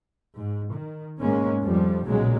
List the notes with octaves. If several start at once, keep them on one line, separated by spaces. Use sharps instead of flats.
G#2
D#3
G#2 B2 G#3 A#3 C#4
F2 F3 G3
B1 A#2 C#3 F#3 G#3